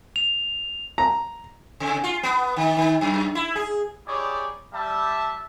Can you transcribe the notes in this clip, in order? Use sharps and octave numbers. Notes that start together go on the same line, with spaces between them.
F7
A#5
C3
F4
B3
D#3
D#3
F#2
E4
G#4
D#4 E4 G4 G#4 C#5 D5
G3 E5 A5